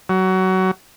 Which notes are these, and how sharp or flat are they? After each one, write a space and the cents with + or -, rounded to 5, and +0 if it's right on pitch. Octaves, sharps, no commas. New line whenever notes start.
F#3 +20